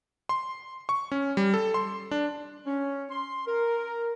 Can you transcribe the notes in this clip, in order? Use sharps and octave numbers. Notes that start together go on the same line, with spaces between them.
C6
C#6
C#4
G3
A4
C6
D4
C#4
C6
A#4